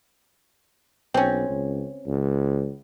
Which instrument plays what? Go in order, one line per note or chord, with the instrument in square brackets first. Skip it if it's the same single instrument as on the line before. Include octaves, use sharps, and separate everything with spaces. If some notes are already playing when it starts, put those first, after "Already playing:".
[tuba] B1 [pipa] C4 C#4
[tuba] C#2
C#2